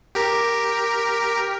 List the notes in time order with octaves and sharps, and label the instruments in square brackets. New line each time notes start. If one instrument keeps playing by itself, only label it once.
[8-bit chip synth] G4 A#4